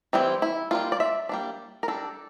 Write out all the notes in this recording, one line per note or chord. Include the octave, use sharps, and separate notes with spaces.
E3 G3 C4 E4
E4
G3 A#3 D4 F4
D5
E5
G3 A#3 D4
A#4
G3 D4 A4